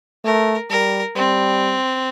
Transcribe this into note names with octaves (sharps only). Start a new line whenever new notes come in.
A3 A#4
G3 A#4
G3 C4